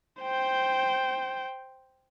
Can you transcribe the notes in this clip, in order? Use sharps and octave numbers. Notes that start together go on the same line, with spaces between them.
C5 G5